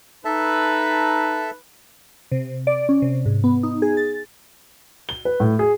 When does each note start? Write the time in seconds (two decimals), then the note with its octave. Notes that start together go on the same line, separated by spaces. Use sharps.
0.25 D#4 A4 B4 E5 A5
2.32 C3
2.67 D5
2.89 C#4
3.02 C3
3.26 G#2
3.44 B3
3.63 D#4
3.82 G#4
3.97 A6
5.09 G7
5.25 B4
5.40 A2
5.59 G#4